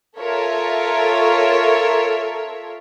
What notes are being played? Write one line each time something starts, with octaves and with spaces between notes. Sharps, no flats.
F4 A4 A#4 C#5 E5